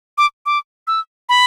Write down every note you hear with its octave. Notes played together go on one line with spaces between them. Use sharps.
D6
D6
E6
B5